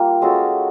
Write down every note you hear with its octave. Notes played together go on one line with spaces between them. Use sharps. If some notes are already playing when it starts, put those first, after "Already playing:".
Already playing: G3 A#3 F4
G#3 C#4 F#4 A4